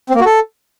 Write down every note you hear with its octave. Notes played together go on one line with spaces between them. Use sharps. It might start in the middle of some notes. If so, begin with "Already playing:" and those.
C4
A#3
F#4
A4